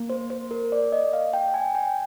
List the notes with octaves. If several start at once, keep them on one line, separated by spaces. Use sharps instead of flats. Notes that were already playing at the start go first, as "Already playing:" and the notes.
Already playing: A#3
C5
C5
A#4
D5
D#5
F5
G5
G#5
G5